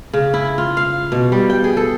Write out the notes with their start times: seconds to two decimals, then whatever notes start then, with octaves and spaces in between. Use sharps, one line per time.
0.13 C#3
0.34 E4
0.58 F4
0.77 F5
1.12 B2
1.32 G3
1.50 G5
1.64 G#4
1.77 A4